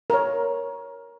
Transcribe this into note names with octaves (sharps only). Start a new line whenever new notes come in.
A#4 C#5